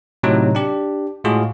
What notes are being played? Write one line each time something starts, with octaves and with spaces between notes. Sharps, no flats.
A2 C3 F#3 D#4
D4 G4
A2 G#3 F4 F#4 G#4